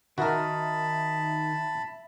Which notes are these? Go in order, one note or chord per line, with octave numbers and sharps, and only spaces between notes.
D#3 D#4 F#4 A#4 E5 A5 B5